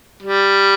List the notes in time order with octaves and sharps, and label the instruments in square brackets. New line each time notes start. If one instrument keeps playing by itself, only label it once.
[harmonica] G3